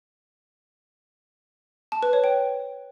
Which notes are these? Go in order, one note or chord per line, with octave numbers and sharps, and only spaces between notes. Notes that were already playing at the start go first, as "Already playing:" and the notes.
A5
B4
C#5
G5